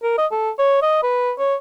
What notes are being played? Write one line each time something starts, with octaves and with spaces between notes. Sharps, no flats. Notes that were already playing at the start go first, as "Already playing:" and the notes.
A#4
D#5
A4
C#5
D#5
B4
C#5